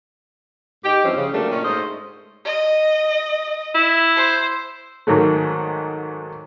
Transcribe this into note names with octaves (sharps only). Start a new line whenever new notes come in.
G#2 D#4 G4
G2 E3 F3 C4 C#4
C#3
F#3 G3 A3 A#3 D4
A#2 D#3 C#4
G#2 A3 C5 D#5
D#5
E4
C5
G#2 D#3 F#3 A3